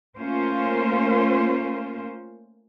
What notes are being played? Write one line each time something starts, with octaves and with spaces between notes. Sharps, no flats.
A3 A#3 C#4 F4 A#4 C5